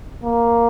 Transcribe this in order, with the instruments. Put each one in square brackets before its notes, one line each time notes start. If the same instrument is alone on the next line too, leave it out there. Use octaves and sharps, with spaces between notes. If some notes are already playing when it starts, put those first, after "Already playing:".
[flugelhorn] A#3